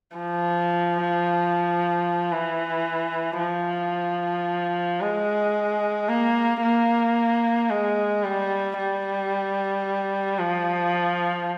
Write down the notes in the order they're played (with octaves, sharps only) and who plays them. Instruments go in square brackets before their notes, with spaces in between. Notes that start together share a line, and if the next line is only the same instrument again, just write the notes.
[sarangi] F3
E3
F3
G#3
A#3
A#3
G#3
G3
G3
F3